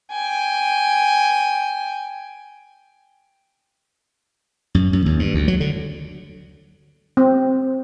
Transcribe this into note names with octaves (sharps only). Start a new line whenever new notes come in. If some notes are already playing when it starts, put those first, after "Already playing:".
G5 G#5
F#2
F#2
D#2
G2
D2
F#3
D3
C4